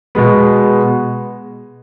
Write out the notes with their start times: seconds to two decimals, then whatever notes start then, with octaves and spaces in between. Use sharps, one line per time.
0.15 B2 G#3 B3